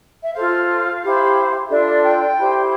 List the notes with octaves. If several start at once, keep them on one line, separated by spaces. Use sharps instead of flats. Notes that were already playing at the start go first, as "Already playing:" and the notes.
E5
F4 A4 C5 F5
E4 G4 C5
D4 F4 A4 E5
D5
G5
E4 G4 C5